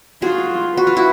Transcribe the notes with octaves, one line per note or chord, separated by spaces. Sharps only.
F4 F#4 G#4
F#4 B4
F4
E4 F#4